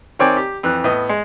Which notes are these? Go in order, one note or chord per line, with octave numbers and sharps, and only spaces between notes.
D#3 C4 C#5 D5 G5 G#5
G4
F2 E3 F#6
A2 B3 D#5
G#3